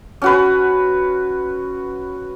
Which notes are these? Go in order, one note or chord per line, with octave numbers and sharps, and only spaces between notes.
C#4 F#4 B4